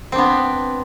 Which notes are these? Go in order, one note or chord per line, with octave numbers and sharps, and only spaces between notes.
B3 C4 D4